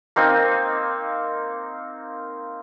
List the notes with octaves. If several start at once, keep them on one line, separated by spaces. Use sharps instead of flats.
A#3 C4 D#4